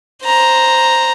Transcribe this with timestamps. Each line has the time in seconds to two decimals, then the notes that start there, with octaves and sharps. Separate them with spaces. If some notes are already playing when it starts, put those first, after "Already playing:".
0.25 C5 A#5